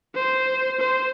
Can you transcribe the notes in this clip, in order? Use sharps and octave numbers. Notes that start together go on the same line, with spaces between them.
C5
C5